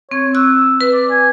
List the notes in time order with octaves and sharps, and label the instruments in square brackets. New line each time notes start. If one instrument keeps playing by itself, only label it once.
[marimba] C4 [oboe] C#5
[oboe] E6 [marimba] F#6
[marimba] B4
[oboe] D5
G#5